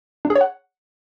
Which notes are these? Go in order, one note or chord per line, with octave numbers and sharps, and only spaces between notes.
D4
G#4
C#5
F#5